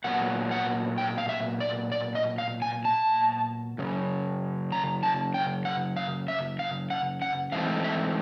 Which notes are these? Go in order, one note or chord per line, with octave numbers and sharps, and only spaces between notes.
A#2 F#3 B3 F#5
F#5
G5
F5
E5
D5
D5
D#5
F5
G#5
A5
F#2 C#3
A#5
A5
G5
F#5
F5
E5
F5
F#5
F#5
G#2 E3 A3 C4 F5
E5